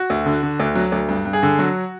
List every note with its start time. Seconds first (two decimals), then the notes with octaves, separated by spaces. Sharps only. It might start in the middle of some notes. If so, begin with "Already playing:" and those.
Already playing: F#4
0.10 D2
0.26 D3
0.43 D3
0.59 D2
0.75 F#3
0.92 D2
1.09 G2
1.25 G2
1.33 G#4
1.43 D3
1.59 F#3 F#4